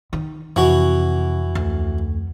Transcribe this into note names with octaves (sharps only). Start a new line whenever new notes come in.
D#3
F2 C3 E3 F#4
D2